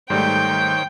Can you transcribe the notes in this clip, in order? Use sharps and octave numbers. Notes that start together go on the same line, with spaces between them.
G#2 D#3 G3 A3 C5 C#5 G5 G6